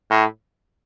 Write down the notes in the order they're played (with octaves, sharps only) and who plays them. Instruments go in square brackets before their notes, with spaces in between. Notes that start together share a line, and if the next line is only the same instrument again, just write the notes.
[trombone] A2